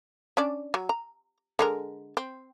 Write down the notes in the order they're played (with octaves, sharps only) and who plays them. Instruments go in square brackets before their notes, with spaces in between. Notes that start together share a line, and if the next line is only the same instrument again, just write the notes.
[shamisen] C#4 D4 D5
F#3
A#5
D3 G#3 A#4
C4